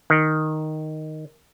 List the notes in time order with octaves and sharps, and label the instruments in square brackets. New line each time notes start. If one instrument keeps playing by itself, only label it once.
[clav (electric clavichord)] D#3